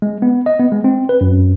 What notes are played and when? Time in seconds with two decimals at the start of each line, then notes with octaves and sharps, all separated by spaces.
0.02 G#3
0.22 B3
0.46 D#5
0.59 B3
0.72 G#3
0.84 C4
1.09 B4
1.21 F#2